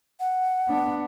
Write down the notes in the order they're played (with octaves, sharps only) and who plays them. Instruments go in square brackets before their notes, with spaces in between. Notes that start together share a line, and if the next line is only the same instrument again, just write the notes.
[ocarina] F#5
[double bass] B3 D4